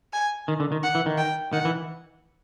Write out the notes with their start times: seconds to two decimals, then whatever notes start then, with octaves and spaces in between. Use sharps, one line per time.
0.13 G#5
0.48 D#3
0.60 D3
0.72 D#3
0.83 F#5
0.95 E3
1.06 D#3
1.18 G5
1.53 D#3 F#5
1.65 E3